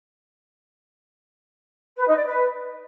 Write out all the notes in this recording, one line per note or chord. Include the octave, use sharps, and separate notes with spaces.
B4
D#4
D5
B4